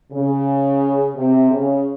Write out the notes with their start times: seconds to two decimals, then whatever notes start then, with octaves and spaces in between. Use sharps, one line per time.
0.12 C#3
1.16 C3
1.50 C#3